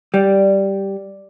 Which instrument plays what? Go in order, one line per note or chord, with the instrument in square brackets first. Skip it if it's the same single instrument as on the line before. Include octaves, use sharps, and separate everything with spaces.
[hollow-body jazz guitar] G3 [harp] D5